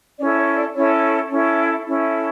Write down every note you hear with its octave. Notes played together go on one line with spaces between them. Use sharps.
C#4 E4 A4 D5
C#5
D5
C#4 E4 A4 C#5
C#4 E4 A4
C#4 E4 A4